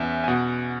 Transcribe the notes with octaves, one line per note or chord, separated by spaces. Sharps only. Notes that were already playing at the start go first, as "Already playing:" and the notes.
Already playing: E2 C#4 E5
G#5
B2 F#5